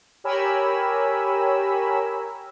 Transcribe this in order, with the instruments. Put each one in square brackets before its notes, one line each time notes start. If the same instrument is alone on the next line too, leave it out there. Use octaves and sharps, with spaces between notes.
[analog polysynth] G4 A#4 C#5 G#5 B5 E6